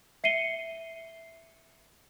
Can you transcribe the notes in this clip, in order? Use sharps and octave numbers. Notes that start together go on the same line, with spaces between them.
E5 C7 C#7 D#7 G7